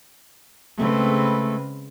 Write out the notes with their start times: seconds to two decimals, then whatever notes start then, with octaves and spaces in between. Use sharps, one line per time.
0.79 C#3 G#3 A3 C4 B4